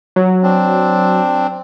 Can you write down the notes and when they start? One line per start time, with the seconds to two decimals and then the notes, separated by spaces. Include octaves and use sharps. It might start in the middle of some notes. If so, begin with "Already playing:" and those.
0.16 F#3
0.43 C4 D4